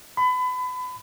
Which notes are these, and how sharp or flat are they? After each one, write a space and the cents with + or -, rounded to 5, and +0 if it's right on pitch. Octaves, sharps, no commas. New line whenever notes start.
B5 +30